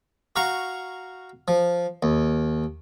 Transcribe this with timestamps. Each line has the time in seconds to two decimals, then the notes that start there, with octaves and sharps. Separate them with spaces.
0.36 F#4 F5 A#5 C#6
1.48 F3
2.03 D#2